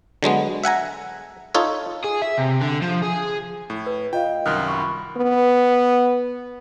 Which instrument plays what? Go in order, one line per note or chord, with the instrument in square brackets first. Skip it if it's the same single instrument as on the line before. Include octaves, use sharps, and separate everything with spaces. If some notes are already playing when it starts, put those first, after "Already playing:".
[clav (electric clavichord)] D3 F#3 G#3 B3
E5 F#5 G#5 A#5
D#4 F4 A4 C#5
[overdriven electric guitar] G#4
E5
C3
D3
F3
G#4
[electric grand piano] A2
[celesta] B4
[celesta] F4 D#5 F5 [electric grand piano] G5
[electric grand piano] C2 F#2 D#3 [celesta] D#6 F6 F#6
[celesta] B5 C#6
[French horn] B3